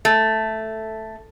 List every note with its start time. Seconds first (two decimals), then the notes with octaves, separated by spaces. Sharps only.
0.05 A3